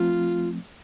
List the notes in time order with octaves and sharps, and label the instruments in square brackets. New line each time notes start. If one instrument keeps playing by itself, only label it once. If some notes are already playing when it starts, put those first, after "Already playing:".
Already playing: [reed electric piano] F3 A3 C4 [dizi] F4